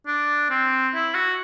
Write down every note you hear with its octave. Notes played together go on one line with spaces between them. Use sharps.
D4
C4
E4
F#4